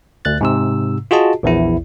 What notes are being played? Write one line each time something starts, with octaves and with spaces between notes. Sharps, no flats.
D2 F#6 A6
G#2 C3 E6
F4 F#4 G#4 D#5 A5
A#1 E2 E4